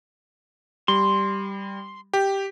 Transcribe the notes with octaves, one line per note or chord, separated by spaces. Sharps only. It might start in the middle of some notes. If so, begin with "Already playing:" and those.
G3 C6
G4